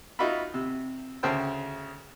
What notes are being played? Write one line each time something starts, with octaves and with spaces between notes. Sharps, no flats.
D#4 F4 F#4 E5 B5
C3
D2 C#3 C5 G5 A5